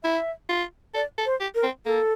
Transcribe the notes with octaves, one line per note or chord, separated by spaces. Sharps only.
E4 E5
F4
A4 D5
A4
C5
G4
A#4
C4
A#3 A4